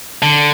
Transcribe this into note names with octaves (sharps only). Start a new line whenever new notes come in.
D3